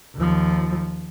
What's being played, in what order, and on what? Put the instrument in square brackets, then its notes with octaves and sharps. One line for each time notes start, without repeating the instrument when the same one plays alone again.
[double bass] D#2 F3